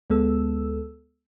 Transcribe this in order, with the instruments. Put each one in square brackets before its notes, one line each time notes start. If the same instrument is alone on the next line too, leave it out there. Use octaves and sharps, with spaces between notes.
[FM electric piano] D2 G#3 B3 A4 E6